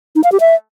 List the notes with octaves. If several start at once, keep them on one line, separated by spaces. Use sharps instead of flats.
D#4
F5
G4
E5